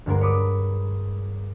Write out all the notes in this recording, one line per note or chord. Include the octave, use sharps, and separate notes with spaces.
D2 G2 G#3 A#4
C#5 B5 D6 D#6